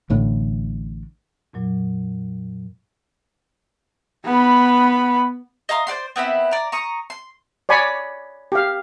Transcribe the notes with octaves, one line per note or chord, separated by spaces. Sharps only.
A1 A2 D3
F2 A#2 F#3
B3 B5
D#5 F5 A#5 C6
C5 D5 F#5 C6
B3 C4 E4 B5
D5 A#5
A#5 C#6 D#6
C6
C#5 D5 G#5 B5 C#6
G4 F5